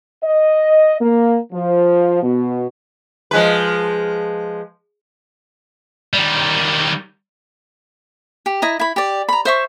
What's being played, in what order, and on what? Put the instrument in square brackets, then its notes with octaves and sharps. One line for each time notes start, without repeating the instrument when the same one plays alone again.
[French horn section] D#5
A#3
F3
B2
[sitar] F3 G#3 B4
[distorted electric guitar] D#3 G3
[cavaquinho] G4
E4 D#5 A#5
E4 B5
G4 D5
A#5 B5
C5 E5 C#6